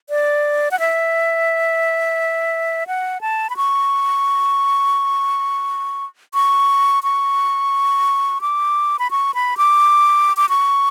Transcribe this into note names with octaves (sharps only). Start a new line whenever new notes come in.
D5
F#5
E5
F#5
A5
B5
C#6
C#6
C#6
D6
B5
C#6
B5
D6
D6
C#6